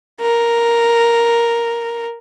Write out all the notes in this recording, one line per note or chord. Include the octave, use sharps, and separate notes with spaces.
A#4